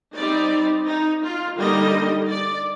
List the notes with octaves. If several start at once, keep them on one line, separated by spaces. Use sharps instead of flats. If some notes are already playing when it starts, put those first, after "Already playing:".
G3 C4 D#4 D5
D#4
F4
D3 G3 A#3 D#4 D#5
D5